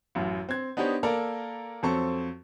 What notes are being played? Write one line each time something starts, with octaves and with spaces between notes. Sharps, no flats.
A1 F#2
C4 G#6
B3 D4 D#4 G4 C5 C#5
A#3 A4 A#4 D5 A#5
F2 F#3 C4 A4 C#6